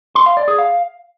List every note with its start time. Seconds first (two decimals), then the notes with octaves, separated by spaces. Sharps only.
0.15 C6
0.26 F5
0.37 D5
0.48 G#4
0.58 F5